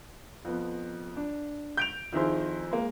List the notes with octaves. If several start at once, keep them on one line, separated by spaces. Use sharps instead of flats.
F2 B3
D4
G6 D7 F7
F2 D#3 E4 G#4 C5
G#3 A#3